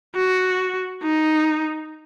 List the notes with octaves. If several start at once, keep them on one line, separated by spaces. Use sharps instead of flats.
F#4
D#4